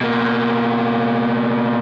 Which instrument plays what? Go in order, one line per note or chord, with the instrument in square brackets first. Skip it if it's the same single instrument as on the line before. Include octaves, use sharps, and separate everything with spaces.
[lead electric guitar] B2 A#3